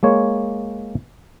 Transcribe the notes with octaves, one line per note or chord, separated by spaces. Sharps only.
G#3 A#3 C#5